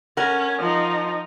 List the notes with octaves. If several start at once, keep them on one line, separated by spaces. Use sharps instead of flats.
C#4 A#4 F#5
F3 D#4